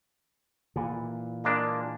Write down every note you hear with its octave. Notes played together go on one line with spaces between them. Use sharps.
A#2 E3
G#3 A#3 D4